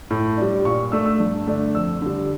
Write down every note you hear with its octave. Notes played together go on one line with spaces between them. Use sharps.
A2
G3 D4
A#2 C#6
A3 D4 E6
E6
G2
D3 A3 D4
F2 E6
D3 G3